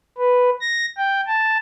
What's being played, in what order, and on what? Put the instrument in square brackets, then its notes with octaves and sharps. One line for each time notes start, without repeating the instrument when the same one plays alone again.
[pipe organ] B4
A#6
G5
A5